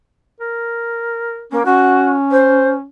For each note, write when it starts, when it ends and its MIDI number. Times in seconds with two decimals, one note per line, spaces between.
0.40 1.46 70
1.52 1.63 58
1.52 1.60 61
1.65 2.85 61
1.65 2.10 66
2.31 2.70 72